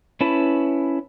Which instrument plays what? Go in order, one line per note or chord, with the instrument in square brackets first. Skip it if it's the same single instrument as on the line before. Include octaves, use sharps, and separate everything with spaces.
[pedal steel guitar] C#4 E4 B4 A5 B5